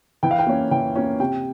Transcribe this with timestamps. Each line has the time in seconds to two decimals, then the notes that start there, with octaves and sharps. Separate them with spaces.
0.23 E3 G5
0.31 F5
0.39 G5
0.47 A#3 C#4
0.71 E3 G5
0.96 A#3 C#4
1.20 C3 G5